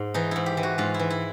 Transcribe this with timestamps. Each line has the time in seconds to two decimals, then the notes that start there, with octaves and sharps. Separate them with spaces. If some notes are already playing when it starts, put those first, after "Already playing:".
Already playing: G#2
0.14 E3 D#4
0.31 G#2 E4
0.46 G4
0.57 E3
0.63 F#4
0.78 G#2 F4
0.94 E4
0.99 E3
1.10 E4